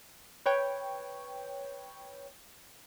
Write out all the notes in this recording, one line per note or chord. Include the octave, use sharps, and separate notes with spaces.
B4 C#5 G5